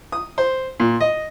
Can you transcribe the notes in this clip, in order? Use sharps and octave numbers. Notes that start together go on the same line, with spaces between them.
D#6
C5
A#2
D#5